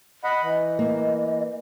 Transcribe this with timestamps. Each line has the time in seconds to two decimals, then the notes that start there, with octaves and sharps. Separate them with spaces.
0.24 D#5 F#5 B5
0.43 E3 D#5
0.79 A#3